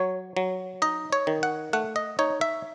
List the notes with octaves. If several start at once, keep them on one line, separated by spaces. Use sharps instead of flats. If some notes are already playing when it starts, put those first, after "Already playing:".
Already playing: F#3 C#5
F#3
D#4 D#5
C#5
D#3
F#5
A3 F#5
D#5
D#4 C#5
E5